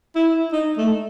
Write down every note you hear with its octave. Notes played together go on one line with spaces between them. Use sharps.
E4
D#4
A3